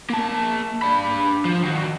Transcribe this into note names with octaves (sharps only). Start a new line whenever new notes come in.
A#3 A5
D4 B5
F3
D#3 F#4